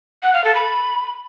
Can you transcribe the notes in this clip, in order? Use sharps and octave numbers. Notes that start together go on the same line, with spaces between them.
F#5
F5
A4
B5